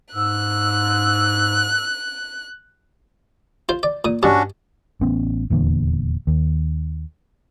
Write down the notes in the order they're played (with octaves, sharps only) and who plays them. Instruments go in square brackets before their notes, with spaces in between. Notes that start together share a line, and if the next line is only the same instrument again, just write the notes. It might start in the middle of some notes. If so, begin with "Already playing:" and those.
[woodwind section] G#2 E6 [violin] F#6
[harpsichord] F4 C5
D5
A#2 D#6
[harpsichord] G2 B2 A5 [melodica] C#4 D4 F#4
[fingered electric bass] A1 B3 C#4
D#1 E2 A#2 D3
D#2